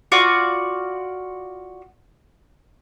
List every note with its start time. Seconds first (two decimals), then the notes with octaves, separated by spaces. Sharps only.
0.12 F4 F#4 D5